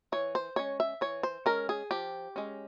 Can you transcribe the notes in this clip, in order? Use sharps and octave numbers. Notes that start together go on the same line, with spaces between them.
E3 C#5
C5
G#3 C#4 C#5
E5
E3 C#5
C5
G#3 C#4 A#4
G#4
F3 G4
G#3 C#4